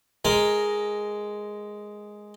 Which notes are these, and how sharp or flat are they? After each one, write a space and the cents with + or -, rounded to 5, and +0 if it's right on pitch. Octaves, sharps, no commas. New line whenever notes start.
G#3 +0 A#4 +0